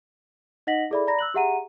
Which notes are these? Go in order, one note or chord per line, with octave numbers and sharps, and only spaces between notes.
D#4 D#5 F#5 A#6 B6 F#7
E4 G#4 A4 D5 E5 B5
D5 A#5 B5 A#6
E6 F#6 F#7
G4 G#4 E5 F#5 A#5 D#7